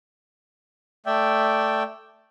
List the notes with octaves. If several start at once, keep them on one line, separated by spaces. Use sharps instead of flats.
A3 D5 E5 G5